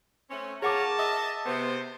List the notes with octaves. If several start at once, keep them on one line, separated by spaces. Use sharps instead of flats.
A3 C4 C#4
F4 G#4 A#4 C#5 F#5 A5 D6
D#5 E5
C3 B3 C5